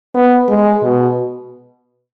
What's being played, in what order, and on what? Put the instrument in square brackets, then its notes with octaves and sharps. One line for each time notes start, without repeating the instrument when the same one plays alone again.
[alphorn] B3
G#3
B2